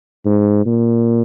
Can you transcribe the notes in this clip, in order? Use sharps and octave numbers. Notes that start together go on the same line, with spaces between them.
G#2
A#2